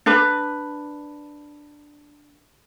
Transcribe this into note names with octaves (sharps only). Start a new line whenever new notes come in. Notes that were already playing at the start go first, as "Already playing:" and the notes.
D4 B4